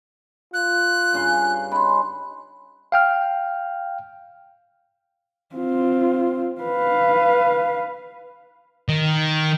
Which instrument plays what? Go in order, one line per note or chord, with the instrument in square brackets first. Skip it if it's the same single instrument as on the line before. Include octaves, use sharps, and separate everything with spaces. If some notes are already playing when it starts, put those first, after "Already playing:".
[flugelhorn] F4 [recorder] F#6
[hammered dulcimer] G2 C#3 C6
[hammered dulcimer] C#4 D#4 [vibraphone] B5 C6
[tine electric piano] F5 G5 F6
[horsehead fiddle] C4 F4
B4 F5
[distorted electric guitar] D#3